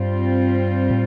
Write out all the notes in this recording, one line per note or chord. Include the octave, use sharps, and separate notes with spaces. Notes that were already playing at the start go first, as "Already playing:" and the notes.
Already playing: G2 G3 C4 F4
A2